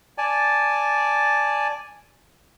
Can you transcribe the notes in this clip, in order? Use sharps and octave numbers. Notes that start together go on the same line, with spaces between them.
D5 G#5 A5